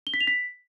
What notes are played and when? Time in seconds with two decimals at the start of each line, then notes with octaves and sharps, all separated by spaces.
0.07 G7
0.14 B6
0.20 F7
0.27 B6